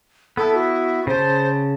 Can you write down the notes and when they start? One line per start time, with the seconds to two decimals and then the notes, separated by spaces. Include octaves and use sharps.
0.37 B3 E4 A4
0.54 F#4
1.07 C#3 C5 A5